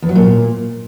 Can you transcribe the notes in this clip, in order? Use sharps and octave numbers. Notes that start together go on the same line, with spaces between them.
E2
F#3
A#2